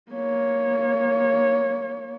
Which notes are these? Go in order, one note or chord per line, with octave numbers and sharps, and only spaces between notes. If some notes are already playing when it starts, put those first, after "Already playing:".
A#3 C#5